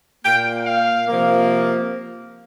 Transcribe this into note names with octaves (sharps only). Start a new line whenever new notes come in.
A#2 A#3 G5
F5
C3 F3 A#3